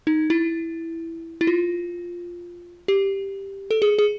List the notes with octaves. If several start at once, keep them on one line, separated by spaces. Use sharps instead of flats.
D#4
E4
E4
F4
G4
A4
G#4
G#4